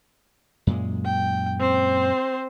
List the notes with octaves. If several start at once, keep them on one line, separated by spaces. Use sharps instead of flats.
F#2 A#2 G#3
G5
C4 C5